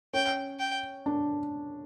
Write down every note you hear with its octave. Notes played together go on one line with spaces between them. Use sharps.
C#4 G5
G5
D4